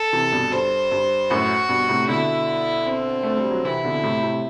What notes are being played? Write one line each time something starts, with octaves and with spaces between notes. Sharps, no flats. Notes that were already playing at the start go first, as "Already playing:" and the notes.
Already playing: A4
C3 E3
G2 B2
G2 C5
G2
F#2 A2 F#4
G2 B2
A2 C3
B2 D3 E4
C4
A3
G3
F#3
C3 E3 E4
B2 D3
A2 C3
A2 C3